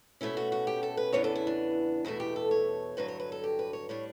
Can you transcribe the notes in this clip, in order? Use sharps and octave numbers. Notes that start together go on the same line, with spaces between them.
B2 A3 C#4 E4
F#4
F#4
G4
A4
B4
E2 C#3 E3 B3 D4 C#5
A4
E4
D4
E2 B2 A3 E4
G4
A4
C#5
G2 D3 F#3 B4
C#5
B4
A4
G4
B4
C#5
A2 G3 D4 C#5